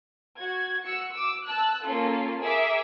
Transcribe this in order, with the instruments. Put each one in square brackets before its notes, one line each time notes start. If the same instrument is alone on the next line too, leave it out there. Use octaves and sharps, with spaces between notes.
[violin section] F#4 G#6
F#4 E6 C#7
D6 E6
A5 E6 F#6
A#3 C#4 F4 A4
G#4 A#4 E5 D6 E6